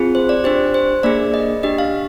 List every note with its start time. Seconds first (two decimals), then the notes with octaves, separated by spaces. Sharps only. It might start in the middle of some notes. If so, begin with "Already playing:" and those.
Already playing: C4 F4 G#4
0.15 C5
0.29 D5
0.44 D4 G4 C5
0.74 C5
1.03 A#3 D4 G#4 D5
1.34 D#5
1.63 D4 G4 D#5
1.78 F5